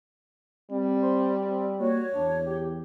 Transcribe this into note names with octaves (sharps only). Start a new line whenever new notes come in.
G3 C4
C5
C4
A#3 F#4 C#5
E2 D4
G4